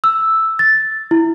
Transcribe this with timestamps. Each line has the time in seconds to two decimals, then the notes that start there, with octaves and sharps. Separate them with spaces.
0.04 E6
0.59 A6
1.11 E4